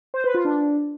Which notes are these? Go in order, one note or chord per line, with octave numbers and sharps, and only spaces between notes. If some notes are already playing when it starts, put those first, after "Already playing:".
C5
B4
F4
D4